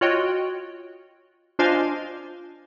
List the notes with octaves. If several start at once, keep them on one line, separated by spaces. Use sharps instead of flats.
F4 F#4 C#5 D#5 G5
D4 F4 C5 D#5 F5 G#5